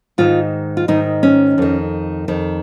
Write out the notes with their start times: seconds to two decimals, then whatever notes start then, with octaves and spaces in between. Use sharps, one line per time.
0.18 G#2 D#3 F4
0.77 F4
0.88 G#2 D#3 D#4
1.23 C#4
1.58 F2 D#3
2.28 F2 D#3